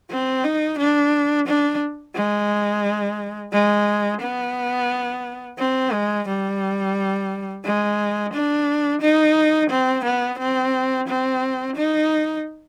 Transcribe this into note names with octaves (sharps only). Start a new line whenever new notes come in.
C4
D#4
D4
D4
G#3
G#3
B3
C4
G#3
G3
G#3
D4
D#4
C4
B3
C4
C4
D#4